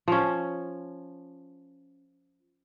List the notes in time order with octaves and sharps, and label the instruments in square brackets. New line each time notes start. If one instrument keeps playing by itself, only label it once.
[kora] F3 C#4